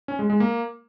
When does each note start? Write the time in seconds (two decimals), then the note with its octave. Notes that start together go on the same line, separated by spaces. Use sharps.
0.08 C#4
0.19 G#3
0.30 G#3
0.40 A#3